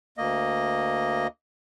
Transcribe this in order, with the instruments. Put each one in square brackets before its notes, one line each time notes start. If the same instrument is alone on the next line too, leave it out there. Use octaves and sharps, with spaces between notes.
[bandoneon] D2 A#3 D#5